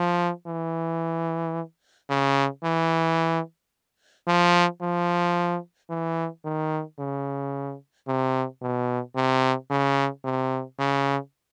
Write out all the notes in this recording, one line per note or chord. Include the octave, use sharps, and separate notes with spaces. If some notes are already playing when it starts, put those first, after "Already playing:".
Already playing: F3
E3
C#3
E3
F3
F3
E3
D#3
C#3
C3
B2
C3
C#3
C3
C#3